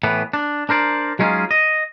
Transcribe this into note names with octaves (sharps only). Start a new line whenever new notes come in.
A2 E3 B3
D4
D4 A#4 C5 D5
F#3 G#3 C#4 D#4 F4 G#4
D#5